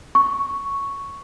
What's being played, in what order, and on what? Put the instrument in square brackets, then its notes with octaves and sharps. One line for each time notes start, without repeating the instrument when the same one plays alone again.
[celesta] C#6